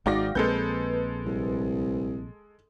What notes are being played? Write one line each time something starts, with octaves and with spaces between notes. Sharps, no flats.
G#1 G#3 D#4 F#4 D5 F5 G5 A#6
A#1 G#3 A#3 C4 A4 B4 G6
C2